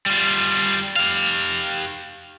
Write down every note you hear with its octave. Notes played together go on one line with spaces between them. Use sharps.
G3 F4
G4 F5